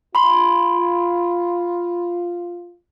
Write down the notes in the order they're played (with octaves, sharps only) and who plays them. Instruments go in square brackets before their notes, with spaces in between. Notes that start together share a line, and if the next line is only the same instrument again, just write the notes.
[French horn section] F4 [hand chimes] B5 C6